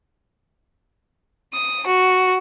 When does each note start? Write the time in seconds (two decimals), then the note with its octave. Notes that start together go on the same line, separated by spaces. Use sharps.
1.53 D#6
1.86 F#4